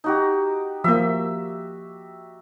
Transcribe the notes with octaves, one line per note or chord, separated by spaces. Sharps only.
D#4 F#4 G4
F3 A#3 E5